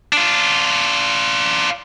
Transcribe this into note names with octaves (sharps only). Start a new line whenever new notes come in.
D4 F4